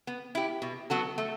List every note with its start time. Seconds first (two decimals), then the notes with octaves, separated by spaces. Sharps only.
0.07 B3
0.35 E4 G4
0.62 B2
0.90 F#3 B3 F#4 A4
1.18 A3